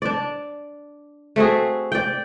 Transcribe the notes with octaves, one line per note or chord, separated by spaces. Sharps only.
D4 D5
A3 C4 F#4 G#4
D5 G5